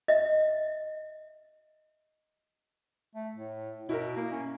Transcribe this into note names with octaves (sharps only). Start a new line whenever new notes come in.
D#5 E5
A3
A2
B2 E4 A#4
A#3
C#4